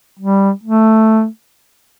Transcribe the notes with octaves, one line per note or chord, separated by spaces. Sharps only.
G3
A3